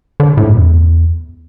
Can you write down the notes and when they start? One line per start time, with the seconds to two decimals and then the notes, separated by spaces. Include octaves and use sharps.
0.20 D3
0.37 A2
0.49 F#2
0.56 E2